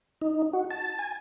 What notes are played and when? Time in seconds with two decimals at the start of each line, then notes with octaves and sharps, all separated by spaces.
0.21 D#4
0.53 F#4
0.71 A5
0.99 G#5